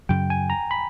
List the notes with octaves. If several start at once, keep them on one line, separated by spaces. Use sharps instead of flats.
F#2 C#3 F#3 G5
G#5
A#5
B5